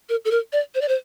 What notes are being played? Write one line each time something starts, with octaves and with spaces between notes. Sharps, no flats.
A#4
A4
A#4
D5
C5
D5
C5